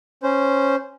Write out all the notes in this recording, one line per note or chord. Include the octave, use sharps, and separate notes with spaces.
C#4 C5